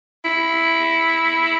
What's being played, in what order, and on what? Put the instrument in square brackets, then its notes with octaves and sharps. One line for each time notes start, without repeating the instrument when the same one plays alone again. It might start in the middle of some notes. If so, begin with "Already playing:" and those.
[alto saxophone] E4